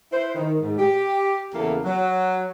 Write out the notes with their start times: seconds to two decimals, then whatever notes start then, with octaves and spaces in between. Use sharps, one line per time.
0.12 E4 B4 C5
0.35 D#3
0.60 G#2
0.78 G4
1.53 E2 C#3 E3 A#3 A4
1.84 F#3